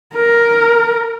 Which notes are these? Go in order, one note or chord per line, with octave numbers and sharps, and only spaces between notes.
A#4